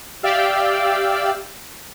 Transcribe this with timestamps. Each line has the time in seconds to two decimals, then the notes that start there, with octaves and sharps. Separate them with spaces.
0.23 G4 D5 E5 F5 G5 E6